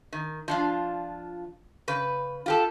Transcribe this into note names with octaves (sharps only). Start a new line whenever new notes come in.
D#3
F3 D4 F4
C#3 B4
F4 G4 A4